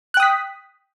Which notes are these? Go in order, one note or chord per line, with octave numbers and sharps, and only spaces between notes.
G5 D#6 F#6 B6